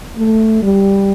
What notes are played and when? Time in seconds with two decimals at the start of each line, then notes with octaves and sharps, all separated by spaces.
0.17 A3
0.63 G3